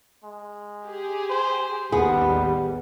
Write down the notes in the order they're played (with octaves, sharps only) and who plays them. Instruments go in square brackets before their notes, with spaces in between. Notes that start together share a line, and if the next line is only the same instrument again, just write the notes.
[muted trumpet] G#3
[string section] G4 G#4
[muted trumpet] C5
[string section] A1 D#2 G3 [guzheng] B3 [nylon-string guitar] G#4 [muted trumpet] B4